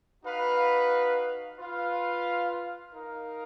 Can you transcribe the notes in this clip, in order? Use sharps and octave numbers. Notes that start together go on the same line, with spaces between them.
D#4 F#4 B4 F5
F4 B4 F5
D#4 A#4 F5